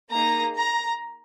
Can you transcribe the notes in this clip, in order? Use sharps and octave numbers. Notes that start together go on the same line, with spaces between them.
A#3 D#4 G#4 A#5
A#5